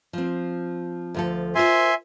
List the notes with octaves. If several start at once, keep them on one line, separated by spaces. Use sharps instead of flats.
F3 C4
D2 F3 A4
F4 A#4 C5 E5 G#5 C6